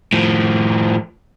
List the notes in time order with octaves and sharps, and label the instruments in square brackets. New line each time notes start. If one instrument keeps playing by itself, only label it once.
[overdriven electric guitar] A2 F3